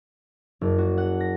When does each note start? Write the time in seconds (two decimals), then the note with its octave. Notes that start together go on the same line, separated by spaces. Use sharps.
0.61 F#1
0.78 F#4
0.98 F#5
1.20 A#6